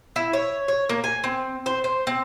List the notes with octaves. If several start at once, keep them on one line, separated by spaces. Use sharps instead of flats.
E4
C#5
C#5
A#3
G#5
C4
C5
C5
C4